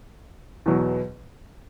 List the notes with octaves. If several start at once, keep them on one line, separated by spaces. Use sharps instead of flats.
E2 B2 F#3